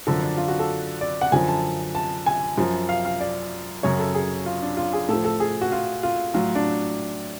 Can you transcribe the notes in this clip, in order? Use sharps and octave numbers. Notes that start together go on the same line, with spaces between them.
F#2 D3 F3 A4
D4
F4
F#4
A4
D5
F#5
F#2 D3 F3 G#5
A5
A5
G#5
F#2 F3
F5
F5
D5
F#2 C#3 F#3 C#5
A4
G#4
F4
D4
F4
G#4
A2 F3 A4
A4
G#4
F#4
F4
F4
A2 F#3 F4
D4